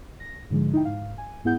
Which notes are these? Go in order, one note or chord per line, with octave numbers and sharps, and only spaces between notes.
A#6
G#2 D3 F3 G#3
D#4 E4 G5
G#2 F5
G#5
G#2 B3 E4 G#4 F#5 G6